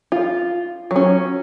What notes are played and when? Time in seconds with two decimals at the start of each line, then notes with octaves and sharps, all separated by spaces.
0.12 F4
0.91 F#3
0.96 C#4